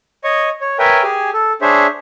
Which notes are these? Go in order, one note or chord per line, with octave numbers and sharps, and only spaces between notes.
C#5 D#5 C#6
C#5
A#4 B4 C#5 E5 G5 G#5
G4 G#4 G#5
A4
D4 G#4 C5 C#5 E5